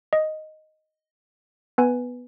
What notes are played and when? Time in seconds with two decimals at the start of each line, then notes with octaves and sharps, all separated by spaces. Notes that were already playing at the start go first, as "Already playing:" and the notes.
0.13 D#5
1.78 B3 B4 G#5